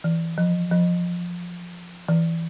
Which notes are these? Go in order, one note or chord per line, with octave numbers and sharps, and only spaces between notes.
E3
F3
F3
E3